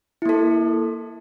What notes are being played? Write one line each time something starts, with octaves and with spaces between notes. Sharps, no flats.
A#3 E4 A4